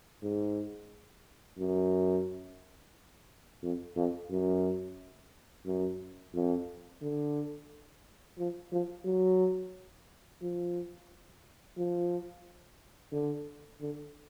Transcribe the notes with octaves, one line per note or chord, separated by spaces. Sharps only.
G#2
F#2
F2
F2
F#2
F#2
F2
D3
F3
F3
F#3
F3
F3
D3
D3